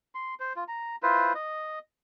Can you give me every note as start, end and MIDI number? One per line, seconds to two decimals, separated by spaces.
0.15 0.34 84
0.40 0.53 72
0.56 0.64 65
0.68 0.96 82
1.03 1.33 64
1.03 1.33 65
1.03 1.33 71
1.03 1.33 72
1.35 1.79 75